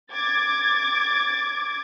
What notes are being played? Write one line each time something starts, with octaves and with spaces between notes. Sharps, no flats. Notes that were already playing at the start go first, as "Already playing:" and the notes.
D6 G#6 A6